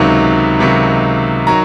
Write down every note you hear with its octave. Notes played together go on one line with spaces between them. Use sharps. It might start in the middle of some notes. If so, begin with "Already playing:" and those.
Already playing: C#2 C3 D#3 F#3
C#2 C3 D#3 F#3
D#3 F#3 A#5